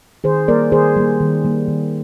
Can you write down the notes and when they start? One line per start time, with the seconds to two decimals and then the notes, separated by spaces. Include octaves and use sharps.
0.24 D#3 G#4 C5
0.48 G3 A#3 A#4 D5
0.72 D#3 G#4 C5
0.97 G3 A#3
1.21 D#3
1.45 G3 A#3
1.68 D#3